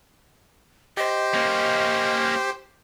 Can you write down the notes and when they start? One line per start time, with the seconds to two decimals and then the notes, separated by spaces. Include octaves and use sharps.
0.97 G4 C5 D#5
1.34 A#3 C#4